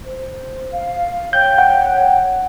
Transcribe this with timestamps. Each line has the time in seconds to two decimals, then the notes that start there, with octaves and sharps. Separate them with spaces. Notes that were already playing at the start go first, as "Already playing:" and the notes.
0.05 C5
0.71 F5
1.33 C#5 G5 G6
1.58 F#5